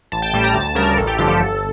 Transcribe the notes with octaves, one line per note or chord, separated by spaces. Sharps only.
A1 A5
G5
A2 G3
A#5
D2 A5
C#3 G3 A#4
A1 A4
G4
G2 D3 F3 G4
A4
G1